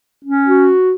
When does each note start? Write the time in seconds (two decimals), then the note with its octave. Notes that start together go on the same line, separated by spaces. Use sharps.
0.23 C#4
0.44 F#4